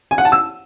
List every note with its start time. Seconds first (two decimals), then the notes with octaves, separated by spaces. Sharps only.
0.11 G#5
0.18 F#5
0.25 A5
0.32 E6